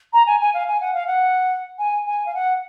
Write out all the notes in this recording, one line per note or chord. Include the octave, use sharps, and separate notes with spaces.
A#5
G#5
G#5
F5
G#5
F#5
F5
F#5
G#5
G#5
F5
F#5